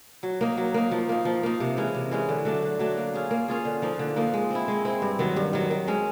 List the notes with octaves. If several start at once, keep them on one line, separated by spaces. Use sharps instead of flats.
F#3
A#3 D#4
F#3
A#3 D#4
F3
A#3 D#4
F3
A#3 D#4
C3
E3 G#3 C#4
C3
E3 G#3 C#4
D3
F#3 A3 D4
D3
F#3 A3 D4
A#3
C#4 F4 G#4
A#3
C#4 F4 G#4
D3
F3 A#3 D#4
D3
F3 A#3 D#4
G#3
C4 E4
G#3
C4 E4
G2
D#3 F#3
G2
D#3 F#3
D#3
G#3 C#4